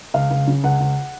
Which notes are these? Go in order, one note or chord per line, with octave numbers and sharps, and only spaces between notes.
C#2 F5
C#2
C#3
C#2 F#5
C#2